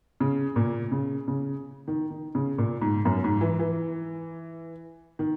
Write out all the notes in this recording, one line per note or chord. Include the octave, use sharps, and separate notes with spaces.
C#3
A#2
C#3
C#3
D#3
D#3
C#3
A#2
G#2
F#2
G#2
E3
E3
D#3